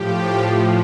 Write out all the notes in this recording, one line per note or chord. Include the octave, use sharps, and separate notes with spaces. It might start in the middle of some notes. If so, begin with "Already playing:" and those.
Already playing: A2 F3 G4